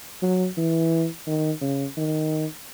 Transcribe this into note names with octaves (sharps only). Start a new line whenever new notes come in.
F#3
E3
D#3
C#3
D#3